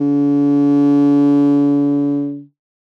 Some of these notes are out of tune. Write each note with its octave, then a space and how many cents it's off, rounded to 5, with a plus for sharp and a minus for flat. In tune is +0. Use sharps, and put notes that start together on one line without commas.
D3 -45